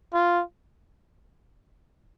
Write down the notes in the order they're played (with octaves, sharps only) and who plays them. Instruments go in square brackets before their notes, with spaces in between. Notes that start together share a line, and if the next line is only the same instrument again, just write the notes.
[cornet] F4